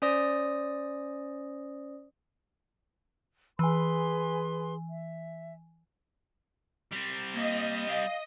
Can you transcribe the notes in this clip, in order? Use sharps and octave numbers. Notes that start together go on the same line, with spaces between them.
C#4 C5 D5 D#6 A#6
E3 G#4 B4 G#5 C6
E5
G3 C4
A#3 D#5
F5